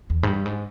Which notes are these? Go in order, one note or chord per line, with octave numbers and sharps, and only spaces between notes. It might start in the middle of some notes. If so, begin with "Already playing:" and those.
E2
G#2
G2
G#2